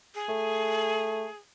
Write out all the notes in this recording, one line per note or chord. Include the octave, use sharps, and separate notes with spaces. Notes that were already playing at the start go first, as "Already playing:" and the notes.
G#4
A3